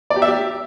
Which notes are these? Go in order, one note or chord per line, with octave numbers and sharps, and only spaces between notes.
D5
G4
E5
G4